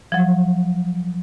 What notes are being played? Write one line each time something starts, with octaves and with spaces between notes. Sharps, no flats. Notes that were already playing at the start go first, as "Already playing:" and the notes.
F3 F#3